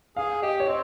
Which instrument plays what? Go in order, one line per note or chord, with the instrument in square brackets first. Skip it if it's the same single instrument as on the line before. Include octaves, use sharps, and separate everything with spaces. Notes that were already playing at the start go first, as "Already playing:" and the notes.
[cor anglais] G#4 [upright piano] F5
[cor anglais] G4 [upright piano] D#5
[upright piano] C#5
[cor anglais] C4 [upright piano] D#5